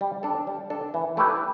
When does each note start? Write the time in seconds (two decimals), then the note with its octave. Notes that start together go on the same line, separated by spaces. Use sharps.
0.01 G3
0.23 D4 A4
0.47 G3
0.70 D4 A4
0.94 E3
1.17 A3 E4 G4 B4